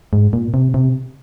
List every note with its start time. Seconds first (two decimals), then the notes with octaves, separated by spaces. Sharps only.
0.13 G#2
0.33 A#2
0.54 C3
0.74 C3